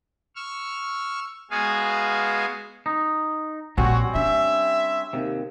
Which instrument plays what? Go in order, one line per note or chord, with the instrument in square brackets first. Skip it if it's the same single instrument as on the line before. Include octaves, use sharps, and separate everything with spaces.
[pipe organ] C#6 E6 F6
G#3 B3 F#4 G#4 F5 G#5
[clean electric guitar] D#4
[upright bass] A#1 [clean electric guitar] G3 C4 C#4 [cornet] F#4
[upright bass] D4 [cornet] E5
[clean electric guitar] D#2 C3